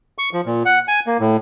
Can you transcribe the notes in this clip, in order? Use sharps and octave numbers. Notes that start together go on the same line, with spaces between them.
C#6
F3
A#2
F#5
G#5
A#3
A2